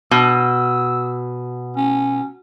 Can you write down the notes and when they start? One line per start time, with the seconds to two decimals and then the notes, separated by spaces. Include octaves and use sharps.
0.11 B2 E6
1.76 C#4